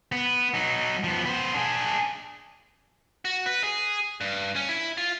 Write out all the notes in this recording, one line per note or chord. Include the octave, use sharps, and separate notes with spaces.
B3
F#3 D#4
F3 B3
B3 C5
D4 G#4
F#4
B4
G#4
G2
C#4
E4
F4